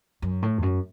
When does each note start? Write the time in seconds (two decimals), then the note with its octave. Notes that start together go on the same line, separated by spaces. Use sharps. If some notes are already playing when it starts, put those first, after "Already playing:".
0.22 F#2
0.42 A2
0.58 E2
0.62 F#2